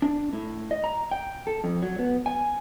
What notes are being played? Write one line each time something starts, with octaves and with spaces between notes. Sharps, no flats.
D4
A2
D#5
A#5
G5
A4
F2
F#3
B3
G#5